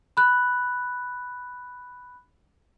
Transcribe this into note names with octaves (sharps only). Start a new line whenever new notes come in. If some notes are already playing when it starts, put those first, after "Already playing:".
B5 F#6